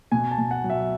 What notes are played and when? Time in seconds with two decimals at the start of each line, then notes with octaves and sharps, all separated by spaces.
0.12 B2 G#5
0.31 A5
0.38 B2
0.51 F#5
0.64 F#3
0.70 E5